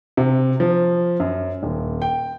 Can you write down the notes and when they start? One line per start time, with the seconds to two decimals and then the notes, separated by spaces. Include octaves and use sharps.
0.17 C3
0.60 F3
1.20 F#2
1.63 D#1
2.02 G5